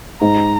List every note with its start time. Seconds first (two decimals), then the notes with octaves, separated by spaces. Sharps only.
0.21 G#2 A#5